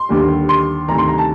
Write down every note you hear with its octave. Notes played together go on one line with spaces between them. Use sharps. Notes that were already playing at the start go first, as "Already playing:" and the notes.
Already playing: C6
D#2 D3 G3
C6
D2 C3 D#3 G3 A#5
C6
A#5
A5